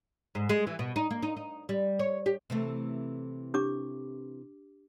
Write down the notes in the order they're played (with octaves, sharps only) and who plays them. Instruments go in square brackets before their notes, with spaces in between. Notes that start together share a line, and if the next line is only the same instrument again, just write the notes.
[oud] G#2
G#3
E3
B2
D#4
A#3
D#4
D#4
G3
C#5
G4
C3 E3 A3
[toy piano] D4 G4 D6